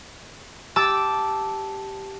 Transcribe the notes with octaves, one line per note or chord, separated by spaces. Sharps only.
G4 A5 D6 E6